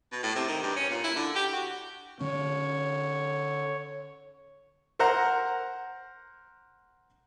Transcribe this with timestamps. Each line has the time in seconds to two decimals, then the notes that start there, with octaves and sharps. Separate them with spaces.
0.12 B2
0.23 A2
0.36 C3
0.48 D#3
0.63 G2
0.76 C#4
0.90 A#2
1.03 E4
1.16 D3
1.35 G4
1.52 F#4
2.21 D3 C#4 C#5
4.99 A#4 C5 F#5 A#5